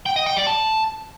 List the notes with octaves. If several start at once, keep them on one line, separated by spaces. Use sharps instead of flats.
G5
D#5
G5
D5
A5